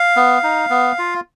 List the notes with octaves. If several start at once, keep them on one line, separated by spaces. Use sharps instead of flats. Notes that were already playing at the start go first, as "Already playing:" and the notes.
Already playing: F5
B3
D#4
B3
F4